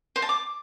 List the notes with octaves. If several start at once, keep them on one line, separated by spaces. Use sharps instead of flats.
C5
A5
D6